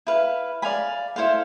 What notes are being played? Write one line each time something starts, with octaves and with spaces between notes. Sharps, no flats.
E4 B4 F5
D5 F5 G#5 B5
E4 A4 C5 F5